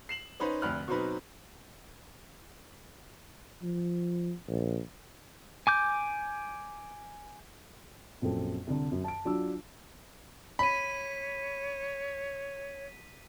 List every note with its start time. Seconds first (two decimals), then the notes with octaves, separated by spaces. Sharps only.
0.09 C7 E7 F#7
0.40 C#4 D#4 B4 C5
0.62 F1 D2 B5 F6 F#6
0.88 B2 F#3 C4 D#4 B4
3.63 F3
4.48 A#1
5.67 G#5 D6 G6
8.22 A#1 F#2 C4 A4
8.67 C2 D3
8.92 F#2
9.04 A5 D7
9.25 F#3 D4 F4 E6
10.59 C#5 B5 B6 D#7